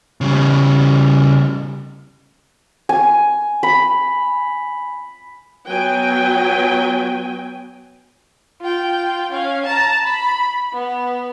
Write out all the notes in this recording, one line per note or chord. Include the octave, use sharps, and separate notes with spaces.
C#3 G3
G#5
B5
F#3 B3 F#4 G5 G#5
F4 G5
C#4 F5
A5 A#5
B5
B3